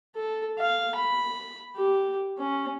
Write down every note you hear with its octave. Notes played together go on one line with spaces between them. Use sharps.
A4
F5
B5
G4
C#4